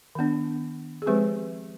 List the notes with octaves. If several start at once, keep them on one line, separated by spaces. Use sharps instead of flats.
D#3 B3 D4
G#4
F3 G#3 C4 G4 B4